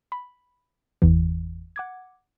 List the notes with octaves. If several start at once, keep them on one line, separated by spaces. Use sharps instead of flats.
B5
G1 E2 E3
F#5 D6 G#6